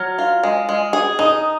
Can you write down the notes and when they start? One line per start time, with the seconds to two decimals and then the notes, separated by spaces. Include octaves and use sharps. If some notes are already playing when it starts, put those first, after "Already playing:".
Already playing: F#3 F6
0.18 F4
0.43 G#3
0.69 G#3
0.93 G#4
1.19 D#4 D#6